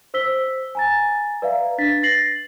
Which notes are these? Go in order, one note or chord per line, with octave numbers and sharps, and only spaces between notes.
C5 E6 B6 G7
G#5 A#5 A6
B4 D5 E5 F5 A#5
D4 B4 A6 B6
A6 A#6 C7 F#7